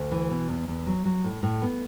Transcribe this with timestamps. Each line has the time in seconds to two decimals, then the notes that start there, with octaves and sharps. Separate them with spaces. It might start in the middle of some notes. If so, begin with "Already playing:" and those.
Already playing: D2
0.11 E3
0.31 B2
0.49 E2
0.68 E2
0.87 F#3
1.05 F#3
1.24 A2
1.43 A2
1.62 B3